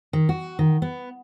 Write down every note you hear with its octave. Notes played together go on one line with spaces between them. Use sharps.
D#3
F#4
D#3
B3